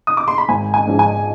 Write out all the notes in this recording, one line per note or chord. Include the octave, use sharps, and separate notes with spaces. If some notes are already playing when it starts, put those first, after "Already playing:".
D#6
D6
C6
B5
G#1 G#5
G#5
G#2 F3
G#5